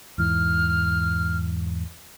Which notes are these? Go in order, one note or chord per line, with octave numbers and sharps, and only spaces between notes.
E2 G#2 E3 F6